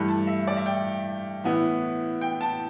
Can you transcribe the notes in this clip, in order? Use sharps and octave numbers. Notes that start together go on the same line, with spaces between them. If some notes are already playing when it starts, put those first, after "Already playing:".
Already playing: G2 E3 A3 E4 B5
A5
E5
D5
E5
G5
A2 E3 B3 E4
G5
A5